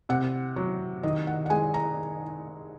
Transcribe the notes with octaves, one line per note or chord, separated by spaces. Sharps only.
C3 F#5
F#3
D#3 D#5
F#5
F#5
G#3 G#5
A#5